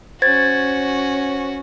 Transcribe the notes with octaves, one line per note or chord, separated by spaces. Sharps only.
C#4 F#4 C5 G#6 A6